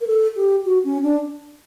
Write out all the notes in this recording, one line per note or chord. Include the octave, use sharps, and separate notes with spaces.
A#4
A4
G4
F#4
C#4
D4